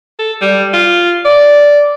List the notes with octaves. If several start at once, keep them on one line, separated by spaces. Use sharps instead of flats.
A4
G3
F4
D5